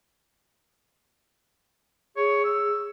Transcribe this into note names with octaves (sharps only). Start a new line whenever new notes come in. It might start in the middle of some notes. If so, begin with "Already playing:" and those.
G#4 C#5
E6